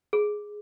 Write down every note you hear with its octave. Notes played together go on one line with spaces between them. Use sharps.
G#4